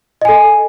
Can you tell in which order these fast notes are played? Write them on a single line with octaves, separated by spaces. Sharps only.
D#5 G#5 A4